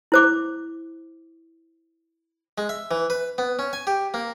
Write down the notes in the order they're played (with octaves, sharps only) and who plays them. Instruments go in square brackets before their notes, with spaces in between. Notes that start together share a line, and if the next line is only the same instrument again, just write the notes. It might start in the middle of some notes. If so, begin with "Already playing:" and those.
[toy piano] E4 C5 D6
[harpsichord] G#3
E5
E3
B4
B3
C#4
G#5
G4
A#3